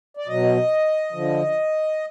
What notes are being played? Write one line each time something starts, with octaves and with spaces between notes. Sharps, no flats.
D5
B2 F#3 D#5
D3 F3